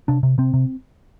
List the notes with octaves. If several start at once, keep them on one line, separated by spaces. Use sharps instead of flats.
C3 D4
C3
C3 C4
C3